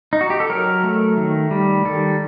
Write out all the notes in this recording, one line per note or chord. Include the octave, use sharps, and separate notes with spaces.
D#4
F#4
G4
A4
F#3 A#4
A3
D#3
G3
D#3 A4